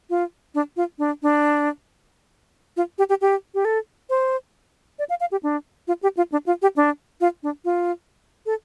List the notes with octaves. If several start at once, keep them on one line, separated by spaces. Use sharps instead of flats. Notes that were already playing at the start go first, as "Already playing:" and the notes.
F4
D4
F4
D4
D4
F4
G4
G4
G4
G4
A4
C5
D5
F5
F5
G4
D4
F4
G4
F4
D4
F4
G4
D4
F4
D4
F4
A4